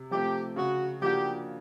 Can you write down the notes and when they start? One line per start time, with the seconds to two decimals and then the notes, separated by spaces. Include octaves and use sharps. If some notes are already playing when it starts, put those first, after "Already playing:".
Already playing: C3
0.11 F3 A3 C4 G4
0.56 C#3 F#4
1.02 F3 A#3 D4 F#4 G4